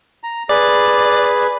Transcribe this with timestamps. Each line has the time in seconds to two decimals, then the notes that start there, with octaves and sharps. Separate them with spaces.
0.23 A#5
0.49 G#4 B4 D5